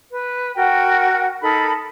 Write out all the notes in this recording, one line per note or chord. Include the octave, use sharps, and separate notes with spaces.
B4
F#4 A#4 G5
D#4 A4 A#4 B5